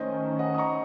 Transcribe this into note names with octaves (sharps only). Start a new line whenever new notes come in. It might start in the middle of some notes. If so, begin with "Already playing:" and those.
Already playing: D#3 A3 C#4 C5 D#5
D#5 F#5
D#6
A#5 C#6